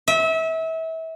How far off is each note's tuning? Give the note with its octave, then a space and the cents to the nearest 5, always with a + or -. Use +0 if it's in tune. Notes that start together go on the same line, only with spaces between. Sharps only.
E5 -30